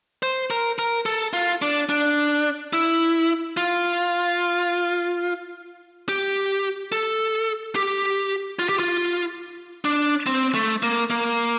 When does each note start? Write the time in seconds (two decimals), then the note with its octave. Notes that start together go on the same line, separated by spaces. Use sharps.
0.23 C5
0.50 A#4
0.79 A#4
1.06 A4
1.33 F4
1.62 D4
1.89 D4
2.73 E4
3.57 F4
6.09 G4
6.92 A4
7.75 G4
8.59 F4
8.69 G4
8.79 F4
9.85 D4
10.26 C4
10.55 A3
10.83 A#3
11.10 A#3